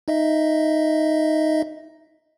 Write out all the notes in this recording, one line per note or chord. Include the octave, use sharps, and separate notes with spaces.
D#4 D#5 E5